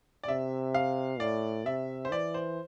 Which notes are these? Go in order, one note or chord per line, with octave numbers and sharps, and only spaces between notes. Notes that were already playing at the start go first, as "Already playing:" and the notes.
D5
C3 E5
F5
A2 D5
C3 E5
C5
E3 D5
C5